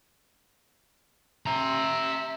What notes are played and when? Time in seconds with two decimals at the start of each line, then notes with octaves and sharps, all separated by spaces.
1.46 E5 A#5